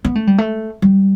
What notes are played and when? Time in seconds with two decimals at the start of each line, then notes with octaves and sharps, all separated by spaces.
0.05 B3
0.15 A3
0.27 G3
0.38 A3
0.82 G3